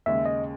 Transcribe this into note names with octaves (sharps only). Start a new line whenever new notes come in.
D#2 C#3 G#3 E5
D#5